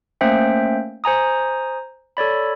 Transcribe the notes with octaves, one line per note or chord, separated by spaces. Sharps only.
A3 A#3 C#4 C5 E5 G5
C5 G#5 A#5 D#6
A4 C#5 D5 B5